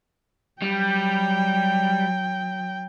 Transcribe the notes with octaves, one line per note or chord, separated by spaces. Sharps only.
F#3 G3 G5